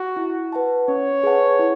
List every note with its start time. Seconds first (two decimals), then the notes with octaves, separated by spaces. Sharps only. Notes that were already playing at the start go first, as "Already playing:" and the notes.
Already playing: F#4
0.16 E4
0.52 B4 F#5 A5
0.88 C#4 C#5
1.23 G#4 B4 F#5 A5
1.59 E4